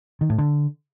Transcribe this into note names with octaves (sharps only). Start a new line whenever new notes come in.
D#3
A2
D3